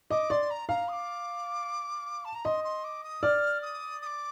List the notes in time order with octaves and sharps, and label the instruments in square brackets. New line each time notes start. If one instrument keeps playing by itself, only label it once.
[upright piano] D#5 [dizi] D6
[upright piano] D5 [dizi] C6
[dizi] A#5
[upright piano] F5 [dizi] A#5
[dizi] D#6
D6
A5
A#5
[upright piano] D#5 [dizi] C6
[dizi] C6
D6
D#6
[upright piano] D5 [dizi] F6
[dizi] D#6
D#6
D6